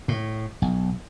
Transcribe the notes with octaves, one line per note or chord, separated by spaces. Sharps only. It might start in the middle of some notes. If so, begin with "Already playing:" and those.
A2
B1